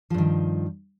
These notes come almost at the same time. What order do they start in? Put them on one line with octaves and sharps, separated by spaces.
F3 G2 D#3